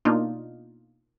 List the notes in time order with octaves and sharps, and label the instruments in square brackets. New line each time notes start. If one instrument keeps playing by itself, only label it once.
[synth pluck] B2 A#3 D4 D#4 F4